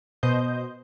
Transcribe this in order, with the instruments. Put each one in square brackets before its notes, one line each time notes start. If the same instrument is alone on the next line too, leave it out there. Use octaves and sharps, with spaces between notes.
[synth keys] B2 C5 D#5 G6